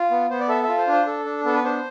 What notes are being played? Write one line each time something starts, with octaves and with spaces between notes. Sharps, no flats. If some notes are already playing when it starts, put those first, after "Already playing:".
Already playing: F4
B3
B3 C5
D5
A4 E5
F4 E5
C5
D4
C5
A4
D4
B3 A4
B4
D4 C5